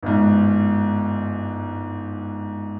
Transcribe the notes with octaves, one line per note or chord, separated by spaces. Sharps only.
G1 G#2